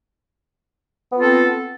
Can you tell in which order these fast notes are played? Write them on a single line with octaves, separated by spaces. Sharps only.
B3 F4 C4 A4